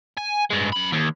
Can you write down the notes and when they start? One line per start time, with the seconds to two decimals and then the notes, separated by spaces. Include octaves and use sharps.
0.17 G#5
0.50 G2 G#3
0.72 F#2 B5
0.92 D#2